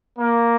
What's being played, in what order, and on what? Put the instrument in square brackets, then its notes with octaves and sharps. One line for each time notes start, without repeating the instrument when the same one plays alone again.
[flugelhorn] A#3